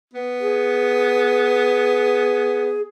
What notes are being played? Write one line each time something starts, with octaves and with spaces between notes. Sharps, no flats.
B3
G#4